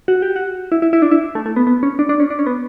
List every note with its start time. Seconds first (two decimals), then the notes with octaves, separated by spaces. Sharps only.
0.08 F#4
0.22 G4
0.36 F#4
0.72 E4
0.82 E4
0.93 E4
1.02 D4
1.11 E4
1.35 A3
1.46 A3
1.56 B3
1.67 B3
1.83 C#4
1.99 D4
2.09 D4
2.20 C#4
2.30 D4
2.39 C#4
2.46 B3